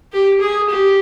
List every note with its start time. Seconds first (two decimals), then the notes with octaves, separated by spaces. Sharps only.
0.13 G4
0.41 G#4
0.69 G4